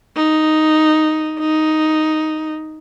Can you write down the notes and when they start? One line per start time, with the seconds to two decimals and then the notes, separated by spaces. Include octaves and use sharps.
0.16 D#4
1.39 D#4